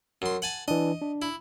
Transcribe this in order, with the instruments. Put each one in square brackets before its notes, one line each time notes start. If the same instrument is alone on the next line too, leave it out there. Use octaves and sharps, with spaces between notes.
[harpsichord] F#2 C6
F#5 G#5 A5
[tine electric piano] E3 D4 [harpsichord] D#5
[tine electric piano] D4
[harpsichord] E4